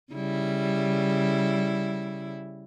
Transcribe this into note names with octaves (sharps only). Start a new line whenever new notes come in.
C#3 G3 E4